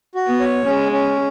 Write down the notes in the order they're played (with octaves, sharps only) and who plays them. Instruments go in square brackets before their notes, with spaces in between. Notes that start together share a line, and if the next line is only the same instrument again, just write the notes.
[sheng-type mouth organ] F#4
[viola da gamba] B3
[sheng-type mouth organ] C#5
[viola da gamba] G#3 [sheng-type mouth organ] C#4
[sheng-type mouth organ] C#4